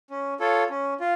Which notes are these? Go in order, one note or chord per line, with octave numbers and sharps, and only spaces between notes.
C#4
F4 A4 C#5
C#4
F4